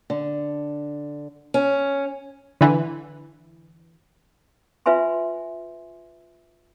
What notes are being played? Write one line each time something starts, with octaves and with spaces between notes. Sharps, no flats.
D3
C#4
D3 E3
F4 B4 E5 G#5 C6